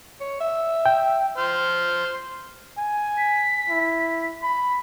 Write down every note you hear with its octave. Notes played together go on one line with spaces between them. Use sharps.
C#5
E5
G5
C5 F6
G#5
B6
E4
B5